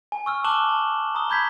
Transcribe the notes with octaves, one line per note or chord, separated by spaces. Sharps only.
G#5
C#6 E6 F6
A5 D6 F#6 E7 F#7 G7
A5 C6
A#5 D#6 G7
A#5 B5 G6 G#6 B6